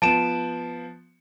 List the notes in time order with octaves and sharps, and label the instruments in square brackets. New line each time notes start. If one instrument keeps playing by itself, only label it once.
[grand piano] F3 B3 [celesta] A5 D7 E7